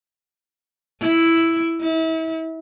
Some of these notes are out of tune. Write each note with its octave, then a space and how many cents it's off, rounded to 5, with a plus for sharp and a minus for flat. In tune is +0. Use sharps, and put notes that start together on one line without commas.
E4 +0
E4 -35